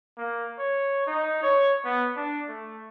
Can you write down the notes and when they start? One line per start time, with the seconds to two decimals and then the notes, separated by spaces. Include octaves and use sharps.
0.18 A#3
0.58 C#5
1.07 D#4
1.43 C#5
1.85 B3
2.17 D4
2.48 A3